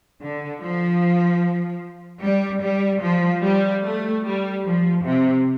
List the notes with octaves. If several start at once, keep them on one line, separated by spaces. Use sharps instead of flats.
D3
F3
G3
G3
F3
G3
A3
G3
F3
C3